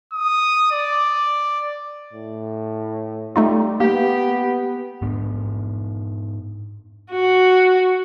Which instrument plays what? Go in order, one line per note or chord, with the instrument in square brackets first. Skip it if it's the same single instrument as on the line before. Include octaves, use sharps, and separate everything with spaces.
[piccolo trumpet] D#6
D5
[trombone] A2
[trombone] G3 [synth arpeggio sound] A3 D#4 F4
[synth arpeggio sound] A#3 [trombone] B3 [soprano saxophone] G4
[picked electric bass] G#2 B3 D4
[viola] F#4